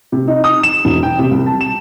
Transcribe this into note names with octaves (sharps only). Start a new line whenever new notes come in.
C3
D#4
D#6
E7
E1
G5
C3
C2
A5
E7